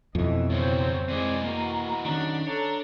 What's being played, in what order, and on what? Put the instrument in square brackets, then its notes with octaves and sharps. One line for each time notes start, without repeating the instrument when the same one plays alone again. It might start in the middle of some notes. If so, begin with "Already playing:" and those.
[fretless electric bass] F2 [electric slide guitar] B2 E3 [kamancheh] D#5 E5
[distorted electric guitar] G2 C#3 [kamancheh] C4 C#5
[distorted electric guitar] E3 D#5 [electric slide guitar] G#3 C4 [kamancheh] D5 G#5
[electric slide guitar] A#3 [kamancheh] F#4 A#5
[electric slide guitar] D#3 C#4 [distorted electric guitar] D4
[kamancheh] A4 A#5 [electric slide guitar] C#5